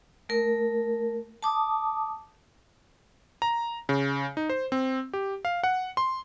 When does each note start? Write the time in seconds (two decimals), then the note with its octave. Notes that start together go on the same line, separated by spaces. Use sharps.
0.29 A3 A#4
1.43 A5 D6 D#6
3.42 A#5
3.89 C#3
4.37 D#4
4.50 C5
4.72 C4
5.13 G4
5.45 F5
5.64 F#5
5.97 C6